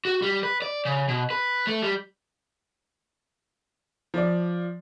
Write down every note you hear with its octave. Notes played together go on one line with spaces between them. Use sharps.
F#4
G3
B4
D5
C#3
B2
B4
A3
G3
F3 D5